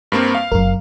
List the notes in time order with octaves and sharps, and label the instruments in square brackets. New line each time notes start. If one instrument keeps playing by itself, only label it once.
[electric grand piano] G2 A#3 C4
F5
[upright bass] F#1 C3 [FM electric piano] F#2 A#4